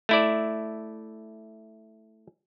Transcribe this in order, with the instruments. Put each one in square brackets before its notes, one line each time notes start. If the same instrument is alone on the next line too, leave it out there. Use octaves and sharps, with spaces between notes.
[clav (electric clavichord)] A3 E4 D5